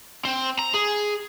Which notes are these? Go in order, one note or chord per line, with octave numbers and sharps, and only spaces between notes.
C4
A#5
G#4